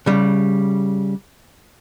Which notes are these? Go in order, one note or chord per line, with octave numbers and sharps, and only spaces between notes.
C#3 G3